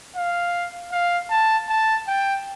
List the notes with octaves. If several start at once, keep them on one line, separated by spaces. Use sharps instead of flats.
F5
F5
A5
A5
G5